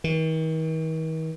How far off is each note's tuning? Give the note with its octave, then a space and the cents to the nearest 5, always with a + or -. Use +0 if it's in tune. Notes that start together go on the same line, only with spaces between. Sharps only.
D#3 +45